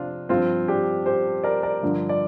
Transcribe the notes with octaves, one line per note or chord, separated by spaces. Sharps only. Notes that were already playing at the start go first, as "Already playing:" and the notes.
Already playing: F2 C3 C4 D4 F4
G2 F3 C4 F4
D4 G4
G4 C5
A#4 D5
A#4 D5
G2 D3 F3
D5